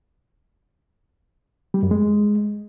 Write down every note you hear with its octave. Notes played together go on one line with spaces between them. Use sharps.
G3
F#2
G#3